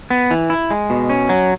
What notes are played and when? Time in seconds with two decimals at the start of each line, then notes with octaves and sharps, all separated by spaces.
0.10 B3
0.31 E3
0.50 E4
0.71 G#3
0.90 B2
1.10 C#4
1.29 F#3